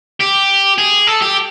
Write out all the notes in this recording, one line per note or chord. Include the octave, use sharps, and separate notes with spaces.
G4
G#4
A4
G4